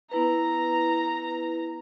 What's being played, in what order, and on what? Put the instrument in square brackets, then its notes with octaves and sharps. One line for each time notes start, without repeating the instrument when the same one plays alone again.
[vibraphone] B3 E4 B4 [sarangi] A#5